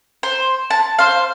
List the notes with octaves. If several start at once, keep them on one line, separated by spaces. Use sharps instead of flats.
C5
A5
C5 F5